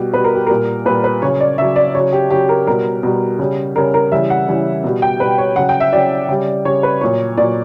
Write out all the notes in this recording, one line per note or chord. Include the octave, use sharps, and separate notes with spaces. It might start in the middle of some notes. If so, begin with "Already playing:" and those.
Already playing: B2 G3 G4
B2 G3 B4
A#4
G4
A#2 G3 A#4
A#2 G3 B4
B4
C#3 F#3 C#5
D5
C#3 F#3 E5
D5
C#3 F#3 C#5
G4
C#3 F#3 G4
A#4
B2 G3 A#4
B2 G3
C#3 G3
C#3 G3 A#4
A#4
C#3 E3 G3 E5
F#5
C#3 E3 G3
B2 G3
G5
B2 G3 B4
C#5
C#3 F#3 F#5
G5
E5
C#3 F#3 D5
C#3 G3
C#3 G3 C#5
B4
A#2 F#3 C#5
A#2 F#3 D5